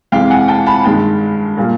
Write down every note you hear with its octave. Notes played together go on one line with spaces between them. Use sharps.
F2 C3 E3 G#3 F5 G5
F#5 G#5
G5 A5
A5 B5
G2 D#3 G#3 G5 A5
A#2 G3 A#3